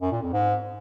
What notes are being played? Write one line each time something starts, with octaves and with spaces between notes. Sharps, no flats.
F#2
A#2
F2
G#2